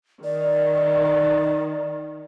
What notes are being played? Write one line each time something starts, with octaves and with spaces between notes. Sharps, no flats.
D#3 D5